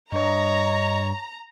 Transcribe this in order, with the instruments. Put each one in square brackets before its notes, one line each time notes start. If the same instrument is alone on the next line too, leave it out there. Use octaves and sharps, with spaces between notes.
[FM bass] G2 [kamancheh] C#5 [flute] D#5 [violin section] A#5